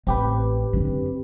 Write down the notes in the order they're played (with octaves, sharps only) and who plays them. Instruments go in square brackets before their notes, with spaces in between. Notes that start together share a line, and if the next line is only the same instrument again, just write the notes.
[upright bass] A1 [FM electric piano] C4 G4 B4
[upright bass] F#2 D3